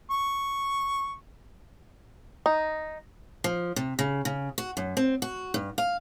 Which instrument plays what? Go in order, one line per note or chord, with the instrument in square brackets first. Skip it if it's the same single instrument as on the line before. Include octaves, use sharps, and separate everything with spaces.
[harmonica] C#6
[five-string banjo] D#4
[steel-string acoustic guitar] F3
C3
C#3
C#3
F#4
F#2
C4
F#4
G2
F5